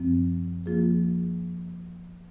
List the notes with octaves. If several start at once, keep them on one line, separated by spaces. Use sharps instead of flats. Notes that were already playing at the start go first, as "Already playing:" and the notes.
Already playing: F#2 F3 C4
F3 A#3 F4 G#4